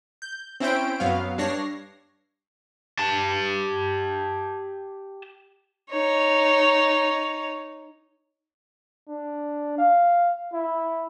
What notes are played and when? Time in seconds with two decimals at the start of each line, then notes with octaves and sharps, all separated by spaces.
0.22 G6
0.60 C4 C#4 E4 C5 G5 D7
1.00 F#2 F#3 B3 F5
1.38 G2 D4 C#5 A#6 C7
2.99 G4 A5
5.90 D#4 C#5
9.08 D4
9.78 F5
10.53 E4